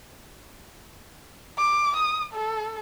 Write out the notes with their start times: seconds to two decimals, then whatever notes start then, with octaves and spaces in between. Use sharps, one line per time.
1.58 D6
1.97 D#6
2.34 A4